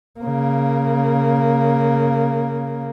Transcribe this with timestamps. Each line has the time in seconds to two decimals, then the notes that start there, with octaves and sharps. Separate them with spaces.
0.20 C#3 A#3